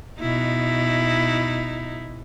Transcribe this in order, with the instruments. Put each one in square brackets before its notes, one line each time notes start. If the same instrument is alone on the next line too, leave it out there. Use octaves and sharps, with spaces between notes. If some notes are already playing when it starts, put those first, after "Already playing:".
[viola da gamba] B2 D#4 E4